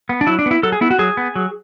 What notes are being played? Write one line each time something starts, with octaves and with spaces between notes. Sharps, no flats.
B3
D4
F#3 E4
D4
B3 E4
F#3 A4
G#4
B3 E4
F#4
F#3 G#4
B3
F#3